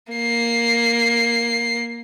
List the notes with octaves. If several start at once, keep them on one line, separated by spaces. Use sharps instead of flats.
A#3 C7